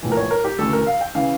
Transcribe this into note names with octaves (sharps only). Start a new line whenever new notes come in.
A#1 A2 E3
A#4
C#5
A#4
G4
D2 C#3 E3 A4
A#4
F5
G5
C#3 E3 F5